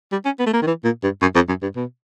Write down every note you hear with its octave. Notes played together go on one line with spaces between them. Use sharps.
G3
C#4
B3
A3
A#3
D#3
E3
A#2
G2
F#2
F2
F#2
G2
B2